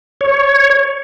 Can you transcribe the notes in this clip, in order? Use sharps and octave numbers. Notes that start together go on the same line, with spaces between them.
C#5